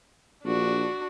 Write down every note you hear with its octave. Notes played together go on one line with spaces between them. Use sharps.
A#1 D4 F#4